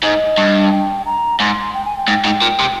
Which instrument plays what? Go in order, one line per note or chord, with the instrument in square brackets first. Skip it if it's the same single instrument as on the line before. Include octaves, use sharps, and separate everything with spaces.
[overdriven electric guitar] G#2 [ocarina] D#5
[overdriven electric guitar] G2
[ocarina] G5
A#5
[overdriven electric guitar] G#2 [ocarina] C6
[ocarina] G5
G#5
G5
[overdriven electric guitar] G#2
G#2
A#2
C3